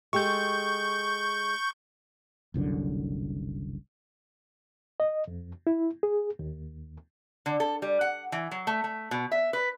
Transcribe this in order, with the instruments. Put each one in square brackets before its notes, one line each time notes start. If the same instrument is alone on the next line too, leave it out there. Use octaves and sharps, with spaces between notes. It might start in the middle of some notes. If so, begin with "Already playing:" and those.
[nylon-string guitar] G#3 G4 A4 [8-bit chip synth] C#6 G6
[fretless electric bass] F#1 C2 F#2 D3
[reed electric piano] D#5
F2
E4
G#4
D#2
[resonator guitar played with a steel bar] D3
A4
G3
F#5
E3
F#3
A3
A3
B2
E5
B4